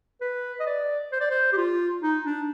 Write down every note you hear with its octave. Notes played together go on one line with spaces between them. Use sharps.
B4
D#5
D5
C5
D5
C5
G4
F4
D#4
D4